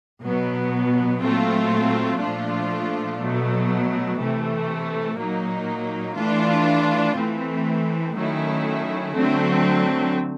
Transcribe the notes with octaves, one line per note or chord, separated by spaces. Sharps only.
B2 F#3 B3
A#2 F#3 A3 C4 F4
A#2 F3 A3 D4 F4
B2 F#3 A3
C3 E3 A3
A#2 F#3 A#3 D#4
E3 A3 D4 F4
E3 A3 C4
D#3 F#3 A3 C#4 E4
D3 F#3 A3 C4